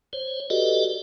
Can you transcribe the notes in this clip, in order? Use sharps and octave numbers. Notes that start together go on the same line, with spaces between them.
C5 C#5
F#4 G4 A4 B4 D5 D#5